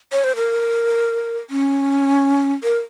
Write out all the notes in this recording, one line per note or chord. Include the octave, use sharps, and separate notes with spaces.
C#5
C5
A#4
C#4
A#4